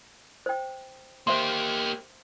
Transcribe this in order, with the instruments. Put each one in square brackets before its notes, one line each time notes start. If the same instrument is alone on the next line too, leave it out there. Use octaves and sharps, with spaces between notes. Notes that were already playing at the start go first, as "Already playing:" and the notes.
[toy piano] C5 G5
[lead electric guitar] A#3 G4 [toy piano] C5 E5 C6